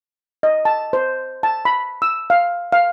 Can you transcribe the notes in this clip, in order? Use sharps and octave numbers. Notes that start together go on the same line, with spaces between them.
D#5
A5
C5
A5
B5
E6
F5
F5